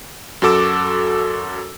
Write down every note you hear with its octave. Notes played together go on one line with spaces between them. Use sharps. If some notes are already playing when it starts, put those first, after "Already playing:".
F#2 F#4 A4 D6 E6